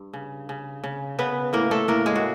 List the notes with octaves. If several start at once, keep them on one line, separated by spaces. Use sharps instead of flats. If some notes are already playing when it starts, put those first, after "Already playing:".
Already playing: G2
C#3
C#3
C#3
C#3 B3 B4
A2 A#3 A#4
A3 A4
A2 A#3 A#4
G#3 G#4
F#4